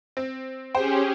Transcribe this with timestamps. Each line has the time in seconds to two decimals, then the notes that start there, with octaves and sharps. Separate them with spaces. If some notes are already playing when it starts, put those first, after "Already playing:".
0.17 C4
0.75 C#4 G4 G#4 C5 G5